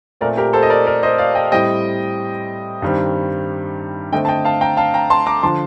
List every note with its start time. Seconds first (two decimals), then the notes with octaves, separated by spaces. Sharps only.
0.21 A#2 A3 C4 A#4 D5
0.37 G4 A#4
0.53 A4 C5
0.63 D#5
0.70 A#4 D5
0.86 A#4 D5
1.03 C5 D#5
1.18 D5 F5
1.35 D#5 G5
1.52 A2 G3 C4 D#5 G5
2.82 G2 D#3 G3 C4
4.12 D3 A3 C4 D#5 G5
4.25 A5
4.28 D#5 G5
4.45 F5 A5
4.61 G5 A#5
4.77 F5 A5
4.94 G5 A#5
5.10 A5 C6
5.26 A#5 D6
5.43 D3 F3 A5 C6